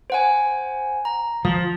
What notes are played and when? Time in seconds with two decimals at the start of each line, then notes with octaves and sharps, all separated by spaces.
0.10 C5 F#5 G#5
1.05 A#5
1.45 F3 D#6